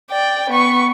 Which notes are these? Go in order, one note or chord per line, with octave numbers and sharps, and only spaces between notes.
D5 G5
B3 C#6